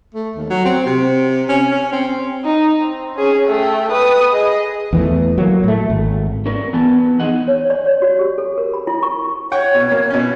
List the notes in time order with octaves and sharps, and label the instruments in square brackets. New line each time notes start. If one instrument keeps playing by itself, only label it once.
[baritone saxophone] A3
D#2
F#3
C4
C3
C#4
C#4
C4
[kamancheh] D#4
C4
C#4 G#4
A3 G5
B4 D#6
G#4 D#5
[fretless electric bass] E2 E3 A3
F#3 A#3
A2 A3
G#1
[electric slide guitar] C#4 A#4 D5
E3 B3 G#5 A5
F2 D#4 G#4 D#5 F#5
[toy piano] C#5
D5
C#5
F#4
G4
A4
A#4
B5
E4
C#6
[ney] C#5 [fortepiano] F#5 G5 C#6
[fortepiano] B2
A#3
B2 C#4